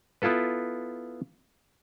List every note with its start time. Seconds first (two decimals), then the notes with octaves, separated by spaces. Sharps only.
0.22 B3 E4 F4 A4 B4